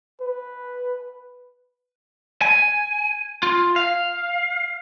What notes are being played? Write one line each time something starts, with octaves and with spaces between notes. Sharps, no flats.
B4
G#5
F4
F5